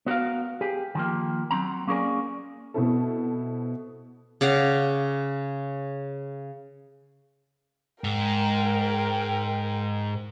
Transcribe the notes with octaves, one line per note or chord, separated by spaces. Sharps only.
B3 F#4 A#4 F5
G4 G#4
D#3 F3 A#3
F#3 C4 A#5
A#3 C#4 G#4 A#4 D5 G#5
B2 B3 C4 E4 A4
C#3 D5 F5 F#5
G#2 A#4 G5